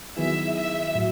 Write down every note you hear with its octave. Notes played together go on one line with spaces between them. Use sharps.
D#3 F#3 B3 E4 G#4 E5
E5
A2 F#3